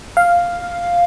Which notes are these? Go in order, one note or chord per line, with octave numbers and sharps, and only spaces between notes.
F5